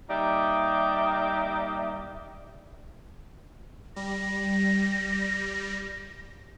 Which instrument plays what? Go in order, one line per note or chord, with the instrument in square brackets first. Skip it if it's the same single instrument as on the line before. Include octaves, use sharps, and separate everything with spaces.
[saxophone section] G3 A#3 D#4 G4 D5 E5
[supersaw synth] G3 [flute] A#6